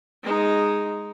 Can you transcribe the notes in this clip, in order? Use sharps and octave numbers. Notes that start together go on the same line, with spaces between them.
G#3 D#4